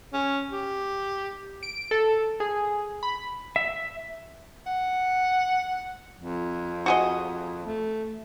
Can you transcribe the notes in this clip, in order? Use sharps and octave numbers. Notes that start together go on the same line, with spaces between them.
C#4
G4
D7
A4
G#4
B5
E5
F#5
F2
F#4 G#4 D#5
A3